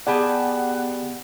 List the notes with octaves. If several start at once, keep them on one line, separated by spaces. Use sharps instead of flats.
B3 G4 G#4 D5 F#5 G#5 A5 B5